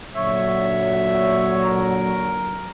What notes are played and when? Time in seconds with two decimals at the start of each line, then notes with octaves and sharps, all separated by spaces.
0.15 A#2 D3 F#3 C#5 E5
1.63 A#4